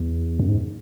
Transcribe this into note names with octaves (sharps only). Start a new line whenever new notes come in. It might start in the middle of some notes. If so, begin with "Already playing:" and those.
Already playing: E2
F#2
G#2